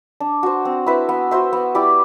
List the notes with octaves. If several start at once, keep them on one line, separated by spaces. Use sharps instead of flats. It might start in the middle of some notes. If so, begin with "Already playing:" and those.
D4
F#4 C5
C4
E4 B4 E5
B3
F#4 C5 E5
B3
E4 G4 D5